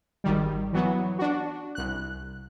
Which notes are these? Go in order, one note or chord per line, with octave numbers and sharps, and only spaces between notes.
G#1 D#3 G3
E3 F#3 B3
D4 F#4
C2 F#6